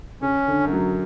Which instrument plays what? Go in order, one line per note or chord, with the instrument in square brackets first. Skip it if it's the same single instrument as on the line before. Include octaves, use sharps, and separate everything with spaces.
[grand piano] C#3 [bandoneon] C#4
[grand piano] D3
[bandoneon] F#2
[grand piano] F#3